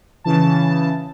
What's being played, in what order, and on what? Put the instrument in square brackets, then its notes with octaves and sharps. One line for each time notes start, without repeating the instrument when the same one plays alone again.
[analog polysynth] C#3 E3 A5